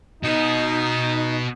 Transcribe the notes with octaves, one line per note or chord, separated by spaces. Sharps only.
B2 B3 D#4